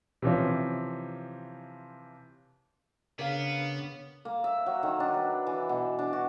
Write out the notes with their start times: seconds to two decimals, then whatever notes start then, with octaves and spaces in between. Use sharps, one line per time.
0.22 C3 E3 F3 C#4
3.19 C#3 B3 D4 G#4 A#4 C#5 F5
4.25 A#3
4.44 E5
4.66 F#3
4.83 D#3
5.00 D4
5.14 B4
5.47 E3
5.69 B2
5.99 D4
6.13 F#4